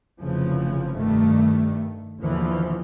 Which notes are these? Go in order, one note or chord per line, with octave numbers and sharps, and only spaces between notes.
F1 C#3 E3 F3
G2 D#3 A3
D#2 B2 D3 E3 F3